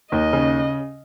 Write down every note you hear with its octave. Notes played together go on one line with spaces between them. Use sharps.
D#2 D#5
C#3